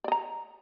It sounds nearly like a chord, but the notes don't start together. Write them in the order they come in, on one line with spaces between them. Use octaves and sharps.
D5 D#5 A#5